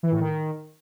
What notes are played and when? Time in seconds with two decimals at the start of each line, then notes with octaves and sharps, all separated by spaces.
0.03 E3
0.12 A2
0.20 D#3